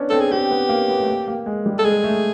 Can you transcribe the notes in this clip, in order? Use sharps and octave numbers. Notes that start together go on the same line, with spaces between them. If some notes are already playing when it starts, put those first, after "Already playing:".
Already playing: B3 C#4 D4
C4 A4
G#4
C4 G4
B3
A#3
B3
A3
A#3
A#3
G#3
G3
A4
G#3 G#4
A3